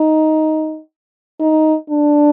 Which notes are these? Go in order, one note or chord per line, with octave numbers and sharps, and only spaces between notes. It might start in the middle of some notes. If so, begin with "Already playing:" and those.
Already playing: D#4
D#4
D4